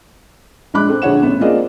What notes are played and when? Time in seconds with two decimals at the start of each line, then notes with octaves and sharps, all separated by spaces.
0.74 A#1 G#3 D4 B5 D6 F#6
0.88 C4 A4
1.02 A#1 D3 G#4 C#5 F#5 E7
1.23 A1 B3
1.41 A#3 C4 F4 G#4 D5 D#5